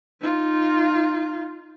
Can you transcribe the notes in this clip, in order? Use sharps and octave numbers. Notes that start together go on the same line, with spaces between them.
D#4 F4